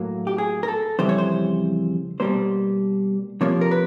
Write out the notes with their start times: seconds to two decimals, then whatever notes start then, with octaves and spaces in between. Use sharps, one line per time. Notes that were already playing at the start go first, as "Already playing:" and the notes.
Already playing: A2 F#3 A#3
0.27 G4
0.38 G#4
0.63 A#4
0.68 A4
0.99 F2 C#3 E3 G3 C5
1.09 C#5
1.18 C5
2.20 B2 G3 A#3 C5
3.41 C3 F3 A#3 C#5
3.61 A#4
3.71 B4